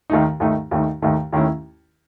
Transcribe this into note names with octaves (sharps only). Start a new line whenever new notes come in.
D#2 D#3 A3 D#4
D#2 D#3 A3 D#4
D#2 D#3 A3 D#4
D#2 D#3 A3 D#4
D#2 D#3 A3 C#4 E4